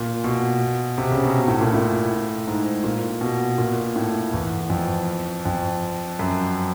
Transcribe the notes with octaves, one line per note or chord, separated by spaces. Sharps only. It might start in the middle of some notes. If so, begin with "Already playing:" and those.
Already playing: A#2
B2
C3
C#3
B2
A2
A#2
A2
G#2
A#2
B2
A#2
A2
E2
F2
F2
F#2